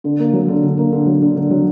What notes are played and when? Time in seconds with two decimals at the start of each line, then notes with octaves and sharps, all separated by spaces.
0.04 D3
0.19 A#3
0.33 F#3
0.48 D3
0.63 D3
0.77 A#3
0.92 D3
1.06 F#3
1.22 D3
1.36 D3
1.51 F#3